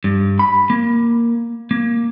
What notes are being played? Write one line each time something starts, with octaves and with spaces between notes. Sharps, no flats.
G2
B5
A#3
A#3